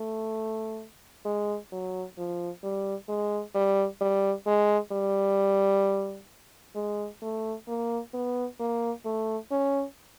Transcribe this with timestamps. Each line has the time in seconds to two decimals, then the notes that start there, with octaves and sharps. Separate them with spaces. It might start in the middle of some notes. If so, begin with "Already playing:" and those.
Already playing: A3
1.25 G#3
1.72 F#3
2.18 F3
2.63 G3
3.09 G#3
3.55 G3
4.01 G3
4.46 G#3
4.92 G3
6.75 G#3
7.22 A3
7.68 A#3
8.14 B3
8.60 A#3
9.05 A3
9.51 C#4